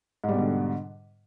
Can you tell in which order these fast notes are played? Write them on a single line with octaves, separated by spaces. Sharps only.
G#2 G3 B2 D3